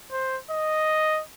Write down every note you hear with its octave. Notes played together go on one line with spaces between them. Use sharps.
C5
D#5